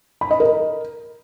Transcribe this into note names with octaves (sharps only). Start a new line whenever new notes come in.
B5
D#5
A#4